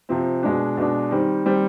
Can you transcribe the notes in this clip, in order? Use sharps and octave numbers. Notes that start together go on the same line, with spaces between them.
C3 F3 C4
B2 G#3 D4
B2 G#3 D4
D#3 G3 C4
D#3 G3 C4